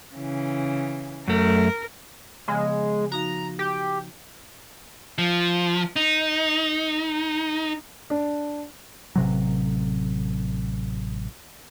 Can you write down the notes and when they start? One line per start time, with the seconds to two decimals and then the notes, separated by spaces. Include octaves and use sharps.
0.15 C#3 E3
1.28 F#2 A3 A#4
2.48 C#3 F3 G#3 B3
3.12 F3 D#4 F#4 A#5
3.59 G4
5.18 F3
5.96 D#4
8.10 D4
9.16 A1 C3 F#3